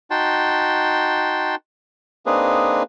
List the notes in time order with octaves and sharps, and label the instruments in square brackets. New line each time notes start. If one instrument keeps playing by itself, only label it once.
[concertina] D#4 F#4 G5 A5 C6
A#3 C4 D4 D#4 G#4 B4